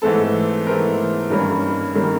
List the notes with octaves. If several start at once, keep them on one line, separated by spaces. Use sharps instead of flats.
G#2 E3 A3 C4 A4
G#2 E3 A3 C4 A#4
G2 D#3 G3 A#3 C#4
D#3 G3 A#3 C#4